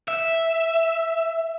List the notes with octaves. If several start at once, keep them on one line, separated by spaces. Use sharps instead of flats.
E5